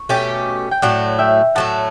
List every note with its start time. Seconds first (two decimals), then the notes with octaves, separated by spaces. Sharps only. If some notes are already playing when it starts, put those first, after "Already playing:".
Already playing: C#6
0.09 B2 A3 C#4 G4
0.71 G5
0.82 A2 F#3 A3 D5 F#5
1.19 E5 G5
1.55 A2 F#3 A3 F#5 A5